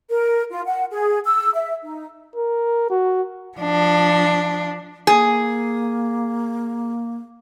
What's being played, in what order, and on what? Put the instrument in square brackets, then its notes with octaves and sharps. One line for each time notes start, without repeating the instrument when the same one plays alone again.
[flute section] A#4
F4
F#5
G#4
E6
E5
D#4
[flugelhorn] A#4
F#4
[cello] F3 D4
[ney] A#3 [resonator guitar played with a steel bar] G#4